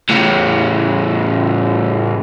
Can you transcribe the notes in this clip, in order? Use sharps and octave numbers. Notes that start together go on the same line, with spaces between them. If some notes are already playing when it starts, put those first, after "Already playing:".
A2 C#3